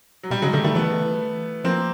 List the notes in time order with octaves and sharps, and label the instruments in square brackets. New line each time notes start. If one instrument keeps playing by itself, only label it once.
[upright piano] F#3
[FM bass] B2 [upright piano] G3
[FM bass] C#3 [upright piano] F#3 G#3
[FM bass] D3 [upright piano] G3 A3
[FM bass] D#3 [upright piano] G3 A3
[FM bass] E3 [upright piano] A3 B3
[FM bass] F3 [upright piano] A#3 C4